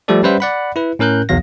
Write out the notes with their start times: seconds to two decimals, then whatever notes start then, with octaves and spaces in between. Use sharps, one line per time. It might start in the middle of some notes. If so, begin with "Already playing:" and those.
0.08 F3 G3 A3 G4 A4 D5
0.23 G3 C#4 B4 C5 E5 F#5
0.40 D5 F#5 B5
0.76 E4 B4
0.99 A2 C#4 A#4 F#6 G6
1.29 B1 E2 F#3 F5 A#6